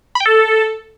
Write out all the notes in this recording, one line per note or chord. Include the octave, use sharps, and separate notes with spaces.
B5
G5
A4